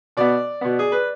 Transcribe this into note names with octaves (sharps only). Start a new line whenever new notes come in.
B2 B3 D5
B2 B3
G#4
B4